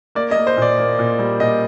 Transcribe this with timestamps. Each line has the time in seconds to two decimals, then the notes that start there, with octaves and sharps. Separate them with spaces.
0.15 A#3 D5
0.31 D#5
0.37 A#3
0.47 C5
0.57 A#2 D5
0.78 A#3
0.99 A#2
1.19 G3
1.40 A#2 D#5